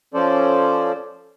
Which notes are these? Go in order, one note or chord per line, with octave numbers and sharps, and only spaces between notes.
F3 C#4 A4 C5 D5